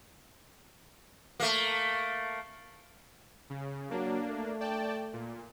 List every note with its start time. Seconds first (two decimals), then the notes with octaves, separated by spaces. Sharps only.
1.40 A3 A#3
3.50 C#3
3.90 F#3 A#3 D4
4.26 A3
4.61 D5 G5 A5
5.13 A#2